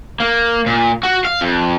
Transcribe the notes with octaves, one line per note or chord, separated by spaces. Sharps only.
A#3
A#2
F#4
F5
F2